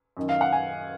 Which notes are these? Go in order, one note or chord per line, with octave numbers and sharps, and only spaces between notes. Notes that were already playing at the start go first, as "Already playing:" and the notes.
F#2 D#3
F5
F#5
G#5